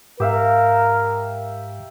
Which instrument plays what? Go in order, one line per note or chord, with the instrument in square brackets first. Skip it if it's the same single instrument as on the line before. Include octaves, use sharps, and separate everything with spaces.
[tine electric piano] G#2 [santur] G4 E5 F5 [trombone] A#4